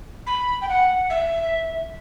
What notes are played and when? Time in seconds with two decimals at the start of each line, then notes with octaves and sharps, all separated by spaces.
0.26 B5
0.61 G5
0.68 F#5
1.09 E5